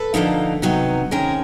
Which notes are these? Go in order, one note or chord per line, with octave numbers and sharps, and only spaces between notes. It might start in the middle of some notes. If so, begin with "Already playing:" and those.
Already playing: A4 B4
D3 F3 A#3 D#4
C3 D#3 F#3 B3 D#4
C3 D#3 G#3 C#4 G#4 A#4